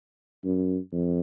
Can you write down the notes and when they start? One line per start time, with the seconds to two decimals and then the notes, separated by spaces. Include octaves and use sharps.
0.45 F#2
0.92 F2